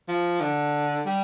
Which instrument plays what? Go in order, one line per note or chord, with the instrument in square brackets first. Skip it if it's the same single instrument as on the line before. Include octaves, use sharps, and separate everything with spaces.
[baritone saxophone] F3
D3
G3